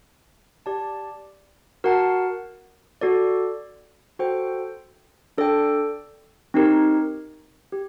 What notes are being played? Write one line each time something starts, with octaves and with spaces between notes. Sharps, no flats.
G4 D5 A5
F#4 A#4 F#5 A5
F#4 A4 D5
F#4 A4 C5 G5
D4 A4 D5 G5
C4 D#4 G4 A#4
G4